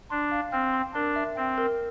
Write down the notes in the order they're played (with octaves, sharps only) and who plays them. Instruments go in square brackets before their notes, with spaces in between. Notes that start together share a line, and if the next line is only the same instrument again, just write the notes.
[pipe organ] D4 [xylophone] C6
[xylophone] F5
[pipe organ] C4 [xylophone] F6
[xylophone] C6
[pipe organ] D4 [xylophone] A#4
[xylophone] E5
[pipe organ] C4 [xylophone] G5
[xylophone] A#4